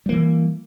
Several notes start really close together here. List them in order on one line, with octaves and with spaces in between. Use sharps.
G3 A#3 E3